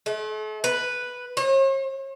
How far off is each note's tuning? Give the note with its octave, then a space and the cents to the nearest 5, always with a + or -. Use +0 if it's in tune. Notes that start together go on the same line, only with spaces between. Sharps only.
A3 -40
B4 +0
C#5 -45